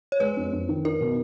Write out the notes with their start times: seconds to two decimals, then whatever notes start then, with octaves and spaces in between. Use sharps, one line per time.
0.12 C#5
0.20 G#3 B4
0.37 F2
0.52 F2
0.69 D#3
0.85 D#4 A#4
1.01 B2